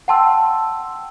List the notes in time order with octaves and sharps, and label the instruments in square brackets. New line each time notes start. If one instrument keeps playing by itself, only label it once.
[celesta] F#5 G5 A5 C6 E6